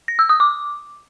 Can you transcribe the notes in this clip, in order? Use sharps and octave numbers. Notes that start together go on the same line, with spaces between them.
A#6
E6
D#6
D6